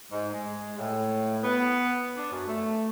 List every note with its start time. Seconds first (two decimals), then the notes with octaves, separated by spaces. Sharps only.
0.12 G#2
0.33 G#3
0.79 A2
1.44 B3
2.17 D4
2.31 F#2
2.47 A3